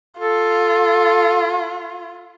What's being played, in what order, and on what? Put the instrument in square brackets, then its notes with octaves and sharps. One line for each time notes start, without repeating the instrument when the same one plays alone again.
[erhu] F4 [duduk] A4